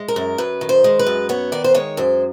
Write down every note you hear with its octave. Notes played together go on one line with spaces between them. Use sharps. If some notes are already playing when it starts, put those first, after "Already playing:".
Already playing: G#3
A#4
F#2
F#2 B4
D#3
C5
G#3
B4
F#2
B3 C#5
D#3 D5
C5
G#3 C#5
F#2 C5